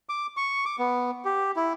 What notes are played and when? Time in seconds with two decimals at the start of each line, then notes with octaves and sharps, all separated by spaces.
0.09 D6
0.37 C#6
0.65 D6
0.79 B3
1.25 G4
1.56 E4